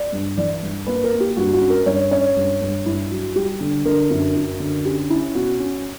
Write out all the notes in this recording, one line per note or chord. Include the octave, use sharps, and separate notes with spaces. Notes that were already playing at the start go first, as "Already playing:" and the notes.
Already playing: D5
G2
E3 D5
G2
A#3 B4
A#4
A#3
G4
G2 F#4
F#4
C#4
A#4
G2 C#5
C#4 C#5
G2
G2
G2 E4
F#3
G3 G4
D3
D3 A#4
F#2
F#2
D3
C#4 G4
C#4 E4
B2 F#4
C#4